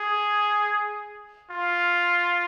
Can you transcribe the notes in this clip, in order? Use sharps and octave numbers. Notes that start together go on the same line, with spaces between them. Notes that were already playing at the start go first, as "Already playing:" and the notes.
Already playing: G#4
F4